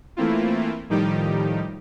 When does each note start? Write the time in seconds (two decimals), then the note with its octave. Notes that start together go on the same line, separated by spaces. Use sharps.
0.17 E3 A3 A#3 C4 E4 F4
0.89 A2 D#3 F3 G3 D#4 G4